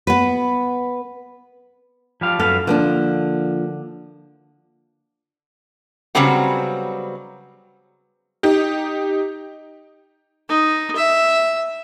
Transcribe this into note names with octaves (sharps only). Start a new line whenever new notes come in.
B3 B4
F3 G3 F5
F#2 B3 A4 F5
D3 F3 A#3 D4
C#3 F#3 G3 B3 C4 F#4
D#4 G4
D#4
E5